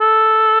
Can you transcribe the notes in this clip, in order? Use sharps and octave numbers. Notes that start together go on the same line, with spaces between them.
A4